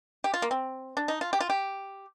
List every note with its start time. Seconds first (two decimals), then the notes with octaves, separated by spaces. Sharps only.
0.24 G4
0.34 F4
0.42 A#3
0.51 C4
0.97 D4
1.08 D#4
1.21 F4
1.33 G4
1.40 F4
1.50 G4